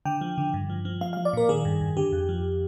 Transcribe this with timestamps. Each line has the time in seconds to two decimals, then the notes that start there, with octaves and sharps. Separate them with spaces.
0.05 D3 G5
0.21 F3
0.38 D3
0.54 G2
0.70 F3
0.85 F3
1.01 F3 F5
1.13 F5
1.17 F3
1.25 D5
1.33 A#2 A#4
1.49 D#3 G#4
1.65 G2
1.81 G2
1.97 D3 G4
2.12 F2
2.29 F3